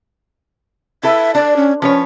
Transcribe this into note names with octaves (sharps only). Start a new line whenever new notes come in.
E4 A4 B4 E5
D4 D5
C#4
F3 C#4 B4 C#5